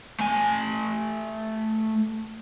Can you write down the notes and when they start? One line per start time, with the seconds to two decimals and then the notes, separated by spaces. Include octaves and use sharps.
0.20 A3 G#5